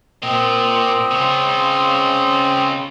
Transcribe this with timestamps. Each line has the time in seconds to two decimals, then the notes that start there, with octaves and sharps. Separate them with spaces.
0.23 A#2 C4 D#5
1.11 C#3 F4